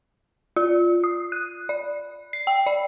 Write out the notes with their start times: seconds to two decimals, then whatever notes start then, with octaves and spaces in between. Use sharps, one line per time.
0.56 F4
1.04 D#6
1.32 F#6
1.69 D5
2.33 C7
2.47 G5
2.66 D5